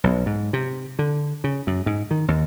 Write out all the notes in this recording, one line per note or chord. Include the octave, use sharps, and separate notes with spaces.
B1
G#2
C3
D3
C#3
F#2
G#2
D#3
D#2